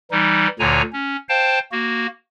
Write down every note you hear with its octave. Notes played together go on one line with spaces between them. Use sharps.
E3 G3 D#4
D2 A#2 D3 C#5 G#5 A#5
C#4
C5 F5 G5 A5
A#3 F#4